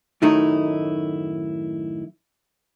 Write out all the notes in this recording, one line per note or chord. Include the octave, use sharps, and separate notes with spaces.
F#2 A2 D#3 A3 D#4 E4